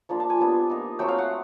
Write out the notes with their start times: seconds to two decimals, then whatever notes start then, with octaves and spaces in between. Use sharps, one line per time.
0.09 F3 A#3 D4 F4
0.20 A5
0.30 G#5
0.40 G3 B3 D4 F4
0.70 A#3 D#4
0.99 F#3 A3 C4 G5
1.08 F5
1.18 F#5